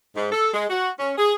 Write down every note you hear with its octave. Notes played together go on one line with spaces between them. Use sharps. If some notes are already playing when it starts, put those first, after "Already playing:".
G#2
A4
G#3
F#4
C#4
G#4